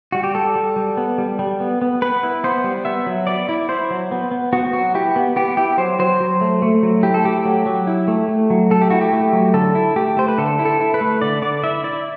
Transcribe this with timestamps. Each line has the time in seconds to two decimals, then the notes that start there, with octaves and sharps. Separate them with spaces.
0.12 G3 F#4
0.23 G4
0.35 G3 A4
0.56 G3
0.76 G3
0.97 B3
1.18 G3
1.39 G3
1.60 B3
1.82 B3
2.02 B3 B4
2.23 E4
2.44 B3 C5
2.64 G3
2.85 B3 E5
3.07 F#3
3.27 B3 D5
3.49 E4
3.69 E4 C5
3.91 F#3
4.11 B3
4.31 B3
4.53 B3 F#4
4.73 F#3 F#4
4.95 E4 G4
5.16 B3
5.36 B3 G4
5.57 E4 G4
5.78 F#3 C5
5.99 F#3 C5
6.20 F#3
6.41 A3
6.62 A3
6.83 F#3
7.03 E4 G4
7.14 A4
7.24 A3 G4
7.45 F#3
7.66 F#3
7.87 E4
8.08 A3
8.28 A3
8.50 F#3
8.71 A3 A4
8.81 G4
8.90 E4 F#4
9.01 G4
9.13 A3
9.33 F#3
9.54 D3 A4
9.75 E4
9.96 A3 G4
10.17 A3 C5
10.28 B4
10.38 D3 A4
10.59 E4
10.65 A4
10.80 E4
10.94 B4
11.01 A3
11.22 D3 D5
11.42 D3 D5
11.63 E4 E5
11.84 E4 D5